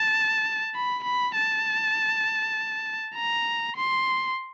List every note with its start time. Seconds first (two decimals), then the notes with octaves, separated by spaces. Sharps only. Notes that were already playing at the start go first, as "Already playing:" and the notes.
Already playing: A5
0.75 B5
1.04 B5
1.35 A5
3.15 A#5
3.76 C6